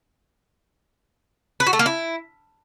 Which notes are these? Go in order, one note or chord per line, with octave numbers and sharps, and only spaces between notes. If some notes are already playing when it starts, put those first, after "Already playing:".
B4
F#4
A3
A#3
E4